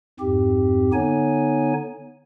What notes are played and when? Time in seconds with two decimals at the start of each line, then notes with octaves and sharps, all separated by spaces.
0.20 F2 G#2 C4 G4
0.93 D3 B3 D#4 C#5 G#5